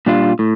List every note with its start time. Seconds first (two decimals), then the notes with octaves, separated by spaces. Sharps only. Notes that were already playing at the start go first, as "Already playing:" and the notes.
0.06 A#2 G3 D4 F4
0.39 A2